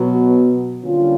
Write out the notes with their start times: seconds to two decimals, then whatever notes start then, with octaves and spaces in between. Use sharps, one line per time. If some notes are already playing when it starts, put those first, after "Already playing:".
Already playing: B2 F#3 B3
0.84 D3 G3 A#3 C#4 F4